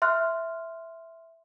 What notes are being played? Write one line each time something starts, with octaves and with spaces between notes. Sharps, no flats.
E5 C6 F6 F#6